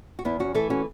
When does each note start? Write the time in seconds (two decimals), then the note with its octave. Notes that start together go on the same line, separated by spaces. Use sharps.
0.19 F#4
0.25 E2 B3 E4
0.40 C#4 F#4
0.55 E3 A3 E4 A4
0.70 C#4 F#4